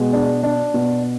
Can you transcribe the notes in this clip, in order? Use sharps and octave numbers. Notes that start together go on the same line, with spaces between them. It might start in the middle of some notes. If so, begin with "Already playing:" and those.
Already playing: B2 G#3
D4
D4
B2